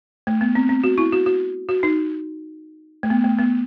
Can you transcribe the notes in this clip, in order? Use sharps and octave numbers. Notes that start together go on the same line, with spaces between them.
A3
B3
C4
C4
F#4
E4
F#4
F#4
F#4
D#4
A3
B3
A3
B3